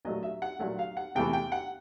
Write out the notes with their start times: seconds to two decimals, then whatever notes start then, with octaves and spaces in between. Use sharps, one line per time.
0.05 A#2 F#3 A3 D#5
0.23 E5
0.42 F#5
0.59 A#2 F#3 A3 F#5
0.79 F5
0.97 F#5
1.15 E2 C3 E3 A3 G5
1.33 G5
1.52 F#5